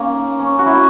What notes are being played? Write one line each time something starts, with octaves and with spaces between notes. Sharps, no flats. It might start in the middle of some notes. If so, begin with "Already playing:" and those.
Already playing: A#3 C#4 D#4
C#4
F#4
E4